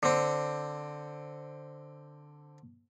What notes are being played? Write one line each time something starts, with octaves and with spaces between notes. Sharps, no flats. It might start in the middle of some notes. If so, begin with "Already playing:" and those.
D3 C4